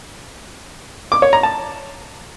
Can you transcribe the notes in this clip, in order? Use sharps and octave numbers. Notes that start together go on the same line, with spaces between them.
D6
C#5
A#5
A5